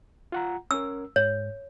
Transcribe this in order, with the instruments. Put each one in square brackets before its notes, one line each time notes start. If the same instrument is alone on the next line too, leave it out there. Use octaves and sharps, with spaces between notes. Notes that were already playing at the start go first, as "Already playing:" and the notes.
[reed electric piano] F4 F#5 A#5
[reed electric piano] C#4 A#4 [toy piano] E6
[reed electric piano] G#2 [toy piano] C#5